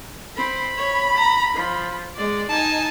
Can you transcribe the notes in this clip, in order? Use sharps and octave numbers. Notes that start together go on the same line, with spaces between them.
C4 B5
C#5
A#5
F3
G#3 D5
D#4 G#5 A5